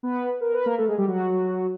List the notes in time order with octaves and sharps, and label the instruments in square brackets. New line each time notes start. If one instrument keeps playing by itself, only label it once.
[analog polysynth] B3 B4
A#4
B4
A#3 A#4
A3 A4
G#3 G#4
G3 G4
F#3 F#4